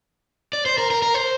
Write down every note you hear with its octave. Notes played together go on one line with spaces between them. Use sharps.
D5
C5
A#4
A#4
A#4
C5